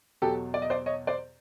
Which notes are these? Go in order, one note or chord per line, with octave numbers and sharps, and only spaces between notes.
E2 B2 F#3 G4 A4
D5
D#5
C5 D5
C#5 D#5
C5 D5